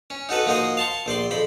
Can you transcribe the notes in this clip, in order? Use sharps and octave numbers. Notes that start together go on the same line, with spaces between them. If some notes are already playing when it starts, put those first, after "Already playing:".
C#4
D#4 F#4 A4 B4
F3 A#3 D#4 F#4 C5 D#5
F5 A5 C6 C#6
A#1 C5 D5 C6
F2 C5 B5